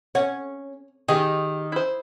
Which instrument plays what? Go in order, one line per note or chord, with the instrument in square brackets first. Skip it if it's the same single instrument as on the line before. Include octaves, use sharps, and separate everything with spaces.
[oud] C#4 [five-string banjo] F#5
[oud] D#3 [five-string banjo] G4 G#4 D#5
[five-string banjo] E4 C5